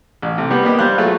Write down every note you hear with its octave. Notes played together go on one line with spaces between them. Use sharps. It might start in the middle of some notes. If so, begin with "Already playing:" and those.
A1
C3 A3
G3 B3 G4 B4 F#5
A#3 B3 G4 D#5
G3 C5 F5 F#6
F#3 G#3 A3 F4 E5